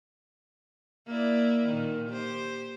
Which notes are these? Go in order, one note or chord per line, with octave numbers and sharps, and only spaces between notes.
A#3 E4 D5
A#2 D#3
G4 C5